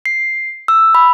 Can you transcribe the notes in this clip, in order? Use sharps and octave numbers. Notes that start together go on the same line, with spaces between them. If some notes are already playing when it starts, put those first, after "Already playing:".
C7
E6
B5